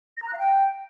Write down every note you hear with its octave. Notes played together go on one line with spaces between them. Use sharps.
A#6
A#5
F#6
F5
G5